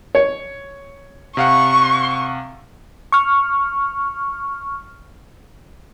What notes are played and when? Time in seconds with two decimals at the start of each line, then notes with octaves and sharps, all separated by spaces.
0.15 C#5
1.37 C3 F5 F#5 C#6
3.12 C#6 F6